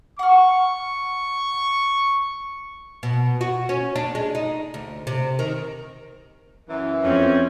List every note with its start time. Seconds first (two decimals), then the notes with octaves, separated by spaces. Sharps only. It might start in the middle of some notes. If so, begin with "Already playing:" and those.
0.19 F#5 C#6 F6
3.03 B2
3.41 F#4
3.69 C#4
3.96 D4
4.15 G#3
4.35 D#4
4.74 D2
5.07 C3
5.39 D#3
6.68 F#2 E3
7.04 F2 C4 C#4